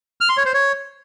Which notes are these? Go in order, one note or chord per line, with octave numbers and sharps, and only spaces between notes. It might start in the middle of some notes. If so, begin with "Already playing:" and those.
F6
C6
C#5
C5
C#5